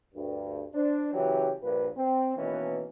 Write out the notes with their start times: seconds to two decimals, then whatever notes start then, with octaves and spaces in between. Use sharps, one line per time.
0.14 D2 G2
0.74 D4 C5
1.14 C#3 E3 F#3 C#4 G4
1.62 A#1 G2 A#2 A#3 B4
1.97 C4
2.37 B2 D#3 E3 A#3 B3 C#4